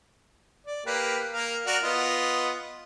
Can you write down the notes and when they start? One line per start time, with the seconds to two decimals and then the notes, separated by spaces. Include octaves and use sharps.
0.66 D5
0.86 A#3 G4 B4
1.32 A#3 A#4 F5
1.66 F#4 A#4 D5
1.84 B3 F4 D#5